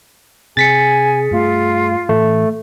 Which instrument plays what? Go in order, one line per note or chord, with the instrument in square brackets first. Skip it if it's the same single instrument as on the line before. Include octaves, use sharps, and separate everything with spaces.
[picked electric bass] C3 [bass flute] G#4 [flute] G#5 [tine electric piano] A6 B6 C#7
[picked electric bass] G2 A3 [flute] F4
[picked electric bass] A2 E3 [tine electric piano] A3